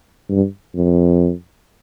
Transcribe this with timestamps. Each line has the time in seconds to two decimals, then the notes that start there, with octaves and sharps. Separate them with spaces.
0.30 G2
0.75 F2